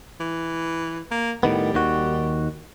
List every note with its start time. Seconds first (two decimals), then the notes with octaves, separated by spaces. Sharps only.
0.20 E3
1.11 A#3
1.43 A2 D#3 G3 B3
1.74 D#2 D#3 F#4